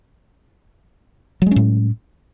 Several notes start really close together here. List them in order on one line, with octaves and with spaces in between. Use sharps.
F#3 G#3 C#4 A2